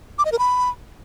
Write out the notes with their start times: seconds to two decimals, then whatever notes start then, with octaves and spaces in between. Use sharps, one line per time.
0.18 D6
0.25 D#5
0.32 A#4
0.39 B5